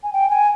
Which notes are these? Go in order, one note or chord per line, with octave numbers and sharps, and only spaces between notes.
G#5
G5
G#5